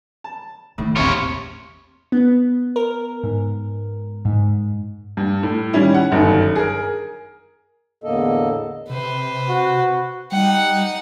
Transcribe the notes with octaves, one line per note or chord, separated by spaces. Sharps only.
A5
A2 D#3 A3
A#1 E2 C3 F4 C#5 B5 C#6
B3
A#4
G#2
G#2
G2
A2
D#3 G3 C#4 E4
F#5
G1 F#2 D#3
G#4 A#4
E2 A2 D3 A#3 A4 D#5
C3 B4 C5
F#4
G3 D#4 F#5 G5